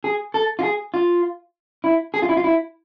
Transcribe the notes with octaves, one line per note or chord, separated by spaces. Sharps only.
G#4
A4
F4
G#4
F4
E4
G#4
F4
E4
F4
E4